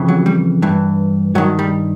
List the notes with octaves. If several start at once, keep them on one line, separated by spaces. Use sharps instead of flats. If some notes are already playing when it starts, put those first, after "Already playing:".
Already playing: F2 C#3 E3
F#3
G3
G2 E3
G2 D#3 F#3
G3